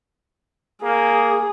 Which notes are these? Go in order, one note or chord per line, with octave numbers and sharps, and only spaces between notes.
A#3 G#4